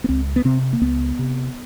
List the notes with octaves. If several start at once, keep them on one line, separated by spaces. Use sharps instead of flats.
B3
C#2 C4
B3
C3 C4
A#3
C#2 B3
C3